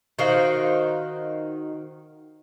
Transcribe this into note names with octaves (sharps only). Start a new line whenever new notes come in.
D#3 F#4 C5 F5